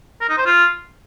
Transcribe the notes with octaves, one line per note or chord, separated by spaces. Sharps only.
A#4
D#4
C5
F4